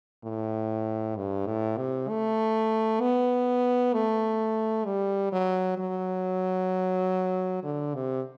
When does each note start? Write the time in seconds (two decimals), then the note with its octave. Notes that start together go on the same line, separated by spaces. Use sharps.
0.24 A2
1.16 G2
1.46 A2
1.77 C3
2.09 A3
3.01 B3
3.94 A3
4.85 G3
5.32 F#3
5.79 F#3
7.63 D3
7.95 C3